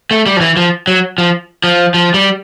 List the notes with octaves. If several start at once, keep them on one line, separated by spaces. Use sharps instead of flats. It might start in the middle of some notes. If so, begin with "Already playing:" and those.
A3
G3
F3
E3
F3
F#3
F3
F3
F3
G3